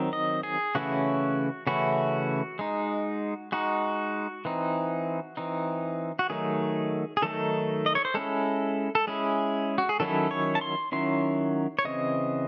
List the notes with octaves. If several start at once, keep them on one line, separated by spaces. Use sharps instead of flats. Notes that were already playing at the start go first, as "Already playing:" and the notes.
Already playing: D#3 F#3 C4 D#4
D#5
G#4
C#3 E3 A3 C#4 E4 F#4
C#3 E3 A3 C#4 E4 F#4
G#3 D#4
G#3 D#4 F#4
E3 C4 D#4
E3 C4 D#4
F#4
D#3 F#3 A3 D#4 G#4
G#4
D#3 F#3 A3 D#4 A4
D#5
C#5
C5
G#3 C#4 E4 A4
A4
G#3 C#4 E4 G#4
F#4
G#4
D#3 F#3 C#4 E4 A4
C#5
A5
C6
D#3 F#3 C#4 E4 C6
C#5
C#3 E3 C4 D#5